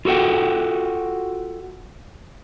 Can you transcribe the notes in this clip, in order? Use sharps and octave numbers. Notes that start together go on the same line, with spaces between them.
F4 F#4 A4 F#5 G5